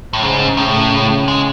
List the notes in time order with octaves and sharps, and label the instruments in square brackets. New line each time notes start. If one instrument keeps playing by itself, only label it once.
[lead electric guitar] A2
[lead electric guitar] G#2 [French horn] C#3
[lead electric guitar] A2 [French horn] C#3
[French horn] C#3
[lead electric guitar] G#3